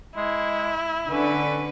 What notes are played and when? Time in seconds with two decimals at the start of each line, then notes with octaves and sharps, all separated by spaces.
0.17 G#3 E4
1.08 D3 C#4 B4